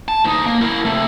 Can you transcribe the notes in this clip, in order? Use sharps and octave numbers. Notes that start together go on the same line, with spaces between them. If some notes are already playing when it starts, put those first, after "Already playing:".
A5
D2 D#4
A#3
E4 A#4
C3 A3